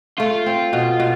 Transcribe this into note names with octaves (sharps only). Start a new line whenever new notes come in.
A3 F4
C4
B2
B2